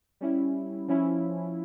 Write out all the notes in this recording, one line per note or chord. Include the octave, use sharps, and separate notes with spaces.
G3 C#4 E4
F3 C#4 E4